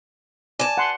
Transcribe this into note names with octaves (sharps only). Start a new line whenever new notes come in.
D5 G#5 A5
F#5 C6